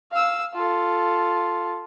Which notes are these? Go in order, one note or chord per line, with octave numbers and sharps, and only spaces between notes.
F5 E6
F4 A4